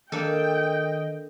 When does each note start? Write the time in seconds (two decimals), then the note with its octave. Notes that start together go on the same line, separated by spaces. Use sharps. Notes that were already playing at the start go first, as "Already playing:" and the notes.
0.12 D#3 A#3 D4 A4 D#5 G5